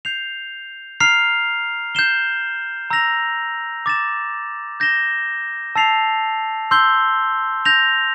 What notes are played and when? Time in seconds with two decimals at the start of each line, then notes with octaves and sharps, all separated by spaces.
0.05 G6 C7 F7
1.00 A#5 F6 C7 F7
1.95 G6 C7 E7 G7
2.90 A#5 E6 A#6 F7
3.86 D6 A6 E7
4.80 G6 A#6 E7 G7
5.76 A5 E6 A6 C7 F7
6.71 C6 E6 G6 C7 G7
7.65 G6 A#6 F7